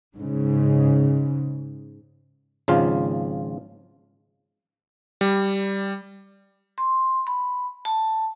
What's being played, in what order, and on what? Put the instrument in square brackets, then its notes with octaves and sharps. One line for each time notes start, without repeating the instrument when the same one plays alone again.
[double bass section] G#2 C#3
[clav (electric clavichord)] G#1 C#3 F3 F4
[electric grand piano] G3
[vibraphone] C6
B5
A5